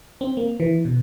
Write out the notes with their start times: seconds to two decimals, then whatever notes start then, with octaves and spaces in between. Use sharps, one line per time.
0.21 C4
0.37 A#3
0.60 E3
0.85 B2